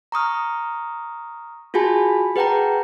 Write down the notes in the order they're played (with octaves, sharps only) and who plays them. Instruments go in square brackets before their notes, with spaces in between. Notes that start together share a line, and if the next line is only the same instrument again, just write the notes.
[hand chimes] A#5 C#6 D#6 F6
F4 F#4 G#4 G#5 A5 B5
G#4 B4 F#5 G5 A5 A#5